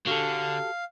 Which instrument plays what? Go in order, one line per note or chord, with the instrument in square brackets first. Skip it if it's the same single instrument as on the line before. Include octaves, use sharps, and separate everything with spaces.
[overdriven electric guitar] D3 [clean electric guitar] F#4 G4 A4 [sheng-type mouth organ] F5